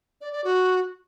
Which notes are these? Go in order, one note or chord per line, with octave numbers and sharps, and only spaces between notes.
D5
D5
F#4